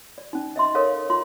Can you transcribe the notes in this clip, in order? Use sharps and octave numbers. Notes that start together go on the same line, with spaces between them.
D5
C#4 D#4
D#5 E5 C6
A4 A#4 C#5 F5
F4 C6